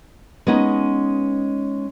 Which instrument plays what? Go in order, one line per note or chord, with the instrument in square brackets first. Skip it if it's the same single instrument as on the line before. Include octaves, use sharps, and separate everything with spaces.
[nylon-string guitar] G#3 B3 C#4 D#4